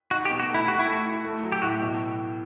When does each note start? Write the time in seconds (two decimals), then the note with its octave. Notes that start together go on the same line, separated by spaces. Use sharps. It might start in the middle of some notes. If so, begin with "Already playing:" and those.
0.11 D#4 F#4
0.25 G4
0.30 B2
0.40 F#4
0.49 A3
0.54 E4
0.68 F#4 G4
0.79 E4
0.87 A3 F#4
1.06 E4
1.25 A3
1.43 F#3
1.52 G4
1.62 A2 F#4
1.69 G4
1.81 B2